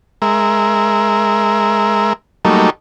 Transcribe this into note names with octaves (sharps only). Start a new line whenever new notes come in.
G#3 A#4 E5
F#3 G3 A3 A#3 D#4 A4